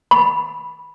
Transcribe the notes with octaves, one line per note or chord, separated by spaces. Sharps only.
B5